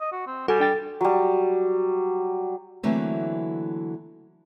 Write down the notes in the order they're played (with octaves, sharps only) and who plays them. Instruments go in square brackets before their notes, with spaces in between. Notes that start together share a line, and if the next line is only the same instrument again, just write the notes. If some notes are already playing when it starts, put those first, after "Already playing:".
[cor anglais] D#5
F#4
C4
[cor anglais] G3 [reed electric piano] F#4 G#5 [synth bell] A4
[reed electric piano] D4 G5 A6
[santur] F#3 G3
[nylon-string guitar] D3 E3 F#3 A3 A#3 C4